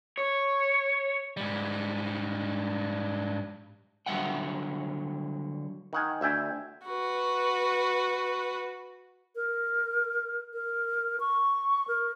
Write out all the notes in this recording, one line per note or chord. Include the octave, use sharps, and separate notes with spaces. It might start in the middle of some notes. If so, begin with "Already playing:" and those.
C#5
G#2 G3
D3 F#3 G3 E5 F#5 G5
D#3 F#5 G#5
D2 E5 G5 G#5
F#4 B4
A#4
A#4
C#6
A#4